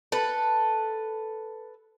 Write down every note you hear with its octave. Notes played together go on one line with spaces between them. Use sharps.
A4 B4